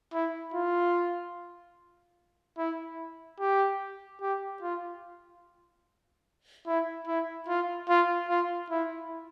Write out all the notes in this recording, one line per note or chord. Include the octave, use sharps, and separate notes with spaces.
E4
F4
E4
G4
G4
F4
E4
E4
F4
F4
F4
E4